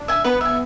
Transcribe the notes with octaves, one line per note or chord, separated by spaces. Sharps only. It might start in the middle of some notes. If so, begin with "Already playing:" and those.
Already playing: D4
E5 G#5
B3 B4
E5 G#5